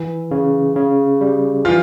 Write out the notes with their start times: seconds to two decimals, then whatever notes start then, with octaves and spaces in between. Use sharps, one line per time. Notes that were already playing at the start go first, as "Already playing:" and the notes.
Already playing: E3
0.31 C#3
0.76 C#3
1.21 G3
1.65 E3 F3 F4